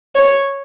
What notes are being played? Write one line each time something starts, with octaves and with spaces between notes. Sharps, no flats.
C#5